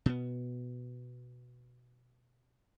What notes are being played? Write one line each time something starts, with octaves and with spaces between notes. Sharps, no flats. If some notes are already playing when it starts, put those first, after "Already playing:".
B2 B3